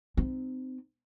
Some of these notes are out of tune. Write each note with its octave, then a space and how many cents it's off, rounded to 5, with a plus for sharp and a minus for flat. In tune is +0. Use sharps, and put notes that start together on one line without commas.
C4 -20 D#4 -15